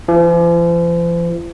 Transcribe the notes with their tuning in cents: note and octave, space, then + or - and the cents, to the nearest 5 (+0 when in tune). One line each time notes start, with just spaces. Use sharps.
F3 -45